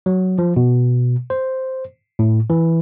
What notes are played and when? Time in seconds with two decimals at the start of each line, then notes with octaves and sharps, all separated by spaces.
0.06 F#3
0.38 F3
0.56 B2
1.30 C5
2.19 A2
2.50 E3